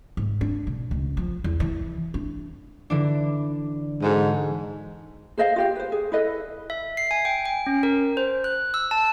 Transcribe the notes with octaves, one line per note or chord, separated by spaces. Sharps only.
G#2
D4
B2
C#2
F3
E2
E3
D4
D3 E3 D4
G#2 F#4 A4 D#5
G#4 C5 D#5 F5
F4 G4 F5
B4 C5
G#4
E4 A4 B4 D#5
E5
C7
G#5
G5
G5
C#4
A#4
C5
F#6
E6
A5